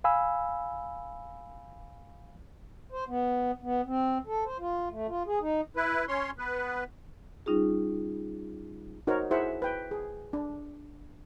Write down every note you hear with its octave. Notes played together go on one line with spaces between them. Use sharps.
F5 G#5 B5 E6
C5
B3
B3
C4
A4
C5
F4
A3
F4
G#4
D#4
E4 B4
C#4 C#5 C6
B3 B4
G3 C#4 D#4 F4 G#4
D#4 F#4 A#4 C5 C#5
E4 G#4 C5 E5 F#5
B4 G5
G#4
D4